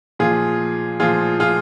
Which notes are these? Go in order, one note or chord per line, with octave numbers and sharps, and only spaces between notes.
A#2 F3 F4 G#4
A#2 F3 F4 G#4
F4 G#4